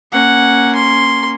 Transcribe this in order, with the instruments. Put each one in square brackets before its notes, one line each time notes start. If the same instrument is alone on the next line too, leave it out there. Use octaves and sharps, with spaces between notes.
[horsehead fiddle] A#3 C#4 [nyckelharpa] F#5
[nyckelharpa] C6